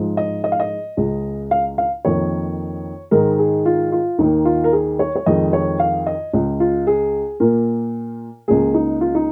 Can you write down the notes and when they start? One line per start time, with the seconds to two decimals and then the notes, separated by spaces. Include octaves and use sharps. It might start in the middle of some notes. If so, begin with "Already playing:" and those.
Already playing: G#2 F3 G#3
0.17 D#5
0.44 D#5
0.52 F5
0.60 D#5
0.97 C#2 C#3 G#3
1.51 F5
1.78 F5
2.05 F2 D#3 A#3 C#5
3.11 G#2 D#3 G#3 A#4
3.38 G#4
3.66 F4
3.92 F4
4.19 D#2 D#3 A#3 D#4
4.45 F4
4.64 A#4
4.73 G#4
4.99 C#5
5.15 C#5
5.26 F2 D#3 G#3 D#5
5.53 C#5
5.80 F5
6.06 D#5
6.33 C#2 C#3 G#3
6.60 F4
6.87 G#4
7.40 A#2 A#3 A#4
8.48 C#2 C#3 A#3 G#4
8.74 D#4
9.01 F4
9.15 D#4